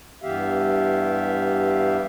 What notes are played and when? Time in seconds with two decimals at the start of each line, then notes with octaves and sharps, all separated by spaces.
0.22 G2 E3 B3 G4 E5 F5